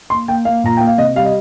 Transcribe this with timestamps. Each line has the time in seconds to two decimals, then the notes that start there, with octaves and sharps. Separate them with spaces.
0.10 A#3 C6
0.28 A#3 G5
0.45 A#3 F5
0.64 A#2 A#5
0.77 A#3 G5
0.87 F5
0.98 C3 D#5
1.16 G3 F5
1.25 D#5